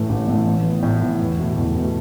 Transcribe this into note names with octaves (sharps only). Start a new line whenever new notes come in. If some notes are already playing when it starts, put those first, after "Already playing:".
Already playing: A2 E3 A3
A1
A2 E3 A3
A2
E3 B3
A2
E3 B3
E2
B2 A3
E2
B2 A3